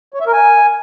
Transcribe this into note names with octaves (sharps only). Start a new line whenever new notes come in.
C#5
E5
A#4
G#5